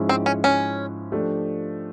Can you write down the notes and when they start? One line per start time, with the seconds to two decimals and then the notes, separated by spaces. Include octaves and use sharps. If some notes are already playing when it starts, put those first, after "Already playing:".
Already playing: G#2 F3 G#3 C#4 E4
0.09 C4
0.26 C#4
0.44 C#4
1.12 F3 A3 D4 G4